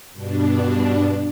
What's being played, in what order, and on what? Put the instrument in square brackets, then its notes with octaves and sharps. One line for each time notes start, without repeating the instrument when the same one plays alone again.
[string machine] G2 B2 D4